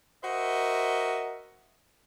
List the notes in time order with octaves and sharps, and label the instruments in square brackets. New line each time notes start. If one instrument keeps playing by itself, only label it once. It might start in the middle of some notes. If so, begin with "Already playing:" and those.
[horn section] F#4 A#4 C5 D#5 E5